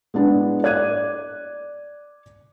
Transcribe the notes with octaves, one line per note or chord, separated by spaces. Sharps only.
G#3 B3 D4 E4
D5 F#6 G#6 D#7